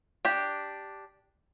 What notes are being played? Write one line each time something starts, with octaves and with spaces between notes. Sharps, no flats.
D4 G4